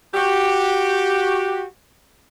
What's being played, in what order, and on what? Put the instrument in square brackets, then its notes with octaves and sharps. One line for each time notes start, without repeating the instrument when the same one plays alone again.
[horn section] F#4 G4